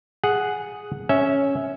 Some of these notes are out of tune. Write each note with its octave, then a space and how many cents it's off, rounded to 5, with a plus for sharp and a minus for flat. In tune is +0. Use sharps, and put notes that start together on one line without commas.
G#4 +0 F#5 +0
C#4 +0 E5 -10